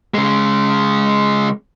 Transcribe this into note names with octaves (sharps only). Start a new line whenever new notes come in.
C#3 G#3